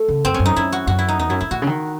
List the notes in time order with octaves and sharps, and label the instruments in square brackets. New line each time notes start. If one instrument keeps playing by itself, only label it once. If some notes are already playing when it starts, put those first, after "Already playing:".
Already playing: [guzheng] A3
[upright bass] C#3
[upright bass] F#2 [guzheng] C4
[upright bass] E2 [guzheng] C#4
[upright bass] F#2
[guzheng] D#4
[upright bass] F#2 [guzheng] E4
[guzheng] F#4
[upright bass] F#2 [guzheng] F#4
[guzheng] E4
D#4
[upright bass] E2 [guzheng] D#4
[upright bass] F#2 [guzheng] E4
[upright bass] G#2 [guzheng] E4
[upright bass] A2 [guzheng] F#4
[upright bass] C#3
D#3